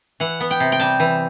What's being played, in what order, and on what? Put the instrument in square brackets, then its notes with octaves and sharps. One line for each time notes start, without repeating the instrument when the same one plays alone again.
[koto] E3 F#5
B3
G5
C3
G5
G3 A5
E3